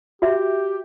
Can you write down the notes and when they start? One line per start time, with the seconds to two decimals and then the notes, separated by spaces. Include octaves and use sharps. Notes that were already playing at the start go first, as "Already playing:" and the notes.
0.22 F#4 G4 E5